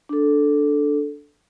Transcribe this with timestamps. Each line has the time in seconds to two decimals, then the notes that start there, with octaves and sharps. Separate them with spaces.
0.09 D4 A4